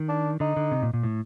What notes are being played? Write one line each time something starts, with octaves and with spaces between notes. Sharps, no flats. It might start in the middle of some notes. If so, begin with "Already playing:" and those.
Already playing: D#3
D4
D3 D#4
D3
C3
A#2
A#2
A2